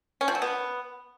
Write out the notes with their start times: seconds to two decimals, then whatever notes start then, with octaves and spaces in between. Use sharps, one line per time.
0.21 C#4
0.28 F3
0.35 F#3
0.42 B3